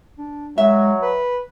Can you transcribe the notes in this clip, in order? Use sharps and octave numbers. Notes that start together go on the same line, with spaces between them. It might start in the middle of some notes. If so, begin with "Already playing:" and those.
D4
F#3 G#3 E5
B4